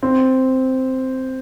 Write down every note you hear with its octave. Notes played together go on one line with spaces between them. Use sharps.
C4